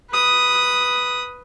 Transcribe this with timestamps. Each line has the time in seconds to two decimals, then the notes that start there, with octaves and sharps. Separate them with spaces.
0.11 B4 D#6